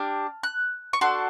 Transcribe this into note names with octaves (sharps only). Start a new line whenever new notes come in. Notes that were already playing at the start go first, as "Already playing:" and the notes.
Already playing: D4 G4 F6
F#6
C#6
D4 F#4 A4 C6